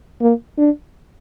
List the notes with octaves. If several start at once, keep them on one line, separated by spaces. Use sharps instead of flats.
A#3
D4